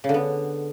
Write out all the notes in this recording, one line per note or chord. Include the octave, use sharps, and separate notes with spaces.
C#3
D3
B3